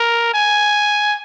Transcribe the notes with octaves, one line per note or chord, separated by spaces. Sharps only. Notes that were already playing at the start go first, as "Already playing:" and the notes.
Already playing: A#4
G#5